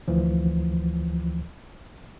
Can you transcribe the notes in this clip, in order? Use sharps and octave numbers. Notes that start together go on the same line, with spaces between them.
D2 E3 F3